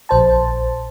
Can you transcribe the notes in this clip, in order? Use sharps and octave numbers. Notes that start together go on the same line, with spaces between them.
A#1 C5 A5